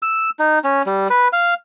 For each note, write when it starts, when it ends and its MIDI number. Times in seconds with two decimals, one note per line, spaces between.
0.02 0.30 88
0.39 0.59 63
0.64 0.82 61
0.86 1.08 55
1.10 1.28 71
1.33 1.54 77